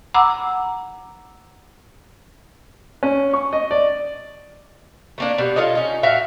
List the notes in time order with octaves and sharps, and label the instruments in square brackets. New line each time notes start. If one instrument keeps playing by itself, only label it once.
[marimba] F#5 A#5 B5 D6 E6
[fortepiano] C#4
C#6
D#5
D5
[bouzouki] A3 A#3 D4
B2 G3
F4 A4 C#5 D#5
C#4 D#4
A2 F#4 E5 F5